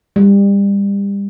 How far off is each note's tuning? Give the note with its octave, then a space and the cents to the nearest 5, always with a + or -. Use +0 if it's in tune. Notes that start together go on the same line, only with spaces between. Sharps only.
G3 +30